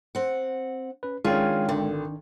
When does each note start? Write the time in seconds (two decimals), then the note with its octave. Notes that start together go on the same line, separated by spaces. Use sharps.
0.15 C4 F#5
1.03 C#4 B4
1.25 D#3 G#3 C#4 D4 F4 G#4 G5
1.69 G#1 D3